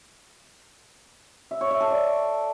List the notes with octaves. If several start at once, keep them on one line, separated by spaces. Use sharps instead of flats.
E5
C#5
E5
A4
D5